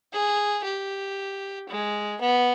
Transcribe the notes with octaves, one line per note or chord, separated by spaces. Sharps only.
G#4
G4
G#3
B3